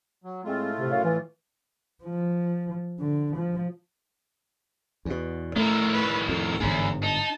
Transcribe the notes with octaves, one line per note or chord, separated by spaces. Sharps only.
F#3
A2 G#3 A3 C4 F4
C3
F#2 C#5 F5
E3
F3
D3
F3
E2 B2
A2 D#3 A3 A#5
B4
F2 A#5
G1 E2 G#2
D#4 A5